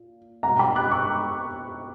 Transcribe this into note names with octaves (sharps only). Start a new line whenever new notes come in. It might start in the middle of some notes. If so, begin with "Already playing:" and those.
Already playing: A#2
B2 G3 F#5 A#5
G5 B5
D6 F#6
C#6 E6